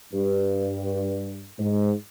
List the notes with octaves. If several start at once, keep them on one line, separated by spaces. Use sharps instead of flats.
G2
G#2